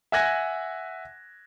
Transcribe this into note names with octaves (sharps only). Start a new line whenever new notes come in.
E5 F#5 G#5 F#6 G#6 A#6